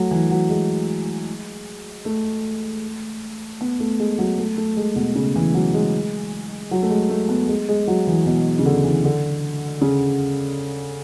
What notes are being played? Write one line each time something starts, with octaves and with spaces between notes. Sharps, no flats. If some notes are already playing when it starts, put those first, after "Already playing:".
Already playing: F#3 A3
E3
F#3
G#3
A3
B3
A3
G#3
F#3
A3
A3
G#3
B2
C#3
E3
F#3
G#3
F#3
A3
G#3
A3
B3
G#3
G#3
F#3
E3
B2
C#3
D3
E3
D3
C#3